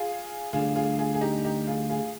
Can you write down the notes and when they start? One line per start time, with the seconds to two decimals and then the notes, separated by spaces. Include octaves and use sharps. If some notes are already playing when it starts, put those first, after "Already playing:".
Already playing: F4 G#4
0.53 D2 D3 G3 F4 G#4
0.76 F4 G#4
0.98 F4 G#4
1.14 G#4
1.21 D#4 G4
1.44 D#4 G4
1.67 F4 G#4
1.90 F4 G#4